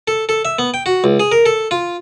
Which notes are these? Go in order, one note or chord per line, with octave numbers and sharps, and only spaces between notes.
A4
A4
E5
B3
G5
F#4
C#2
G#4
A#4
A4
F4